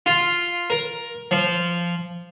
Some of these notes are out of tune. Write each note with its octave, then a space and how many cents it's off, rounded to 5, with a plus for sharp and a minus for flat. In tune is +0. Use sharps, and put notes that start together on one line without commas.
F4 +0
A#4 +10
F3 -10